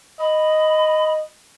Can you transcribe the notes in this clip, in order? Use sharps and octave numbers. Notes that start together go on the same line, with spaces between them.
D#5 B5